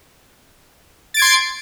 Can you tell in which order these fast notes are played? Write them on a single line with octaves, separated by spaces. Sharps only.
A6 D7 G#6 C6